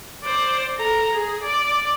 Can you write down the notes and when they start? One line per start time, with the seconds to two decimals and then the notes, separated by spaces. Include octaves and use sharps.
0.23 C5 D5
0.77 A4 A#5
1.13 G#4
1.43 D5